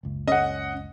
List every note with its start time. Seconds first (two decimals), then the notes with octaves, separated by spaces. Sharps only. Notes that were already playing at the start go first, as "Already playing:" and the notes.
0.03 F#1 C#2
0.28 C#4 D#5 F#5